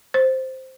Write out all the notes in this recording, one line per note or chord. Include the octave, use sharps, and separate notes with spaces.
C5